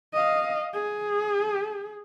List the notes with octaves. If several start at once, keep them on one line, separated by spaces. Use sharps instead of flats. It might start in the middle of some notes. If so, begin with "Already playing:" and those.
D#5 F5
G#4